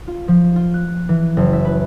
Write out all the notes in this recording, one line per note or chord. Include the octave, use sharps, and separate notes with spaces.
F4
F3
F4
F#6
E3
F#1
E5
B4